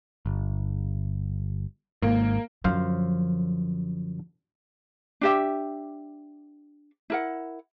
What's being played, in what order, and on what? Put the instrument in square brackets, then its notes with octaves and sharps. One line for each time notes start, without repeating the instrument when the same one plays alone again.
[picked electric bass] G1
[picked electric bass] G#1 G#2 [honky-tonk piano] A#3
[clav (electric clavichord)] F#2 C5 F5 [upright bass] D3 F3
[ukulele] D4 G4 E5
E4 A#4 F#5